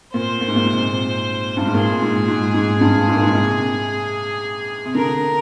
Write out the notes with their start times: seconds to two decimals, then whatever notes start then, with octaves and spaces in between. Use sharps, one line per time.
0.14 A#2 C5
0.41 A#2
0.48 G#2
0.56 A#2
0.67 C3
1.57 G2
1.65 G#2
1.74 A#2 G#4
2.02 G#2
2.28 G#2
2.54 G#2
2.81 G2
3.08 G#2
3.15 A#2
3.24 G#2
3.34 C3
4.85 C3
4.95 D3 A#4